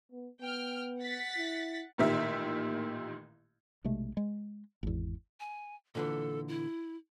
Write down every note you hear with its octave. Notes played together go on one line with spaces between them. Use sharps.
B3
B3 G5 F6
F#5 A6 B6
E4
A1 A#2 D#3 G4 E5
B1 C3 G#3 A3
G#3
G#1 E2
G#5
A#2 D3 E3 A4
E4